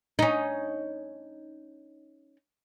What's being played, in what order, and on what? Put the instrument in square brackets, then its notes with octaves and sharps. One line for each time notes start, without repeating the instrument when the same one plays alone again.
[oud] C#4 D#4